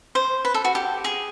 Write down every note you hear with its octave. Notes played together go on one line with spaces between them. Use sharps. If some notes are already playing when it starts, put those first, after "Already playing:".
C5
B4
A4
F#4
G4
G#4